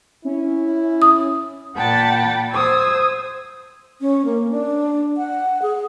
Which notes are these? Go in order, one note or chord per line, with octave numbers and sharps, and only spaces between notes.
C#4 E4
D#6
A#2 F#5 G5 A5 B5 A6
C5 D#6 E6 G#6
C#4
A#3
D4
F#5
G#4